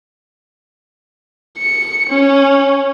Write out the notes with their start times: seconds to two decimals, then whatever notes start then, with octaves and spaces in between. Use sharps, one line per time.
1.58 C#7
2.10 C#4